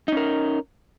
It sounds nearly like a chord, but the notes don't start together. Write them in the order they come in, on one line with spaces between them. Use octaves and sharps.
D#4 C#4 A#4